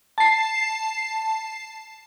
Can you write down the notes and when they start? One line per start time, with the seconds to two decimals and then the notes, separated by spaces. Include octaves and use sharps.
0.18 A5 C7